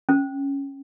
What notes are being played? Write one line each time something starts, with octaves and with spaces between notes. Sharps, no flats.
C#4